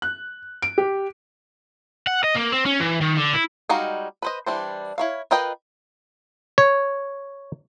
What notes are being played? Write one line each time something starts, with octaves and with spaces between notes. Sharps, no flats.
F#6
D7
G4
F#5
D#5
A#3
C4
C#4
E3
D#3
D3
E4
G3 G#3 D#4 F#4 F5
B4 C5 D#5
E3 G3 D4 C5
E4 C#5 F5
F4 A#4 B4 D#5 G5
C#5